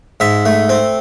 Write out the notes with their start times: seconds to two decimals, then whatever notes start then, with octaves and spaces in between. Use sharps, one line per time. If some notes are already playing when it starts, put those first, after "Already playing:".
0.20 G#2 E5
0.45 A3
0.69 C4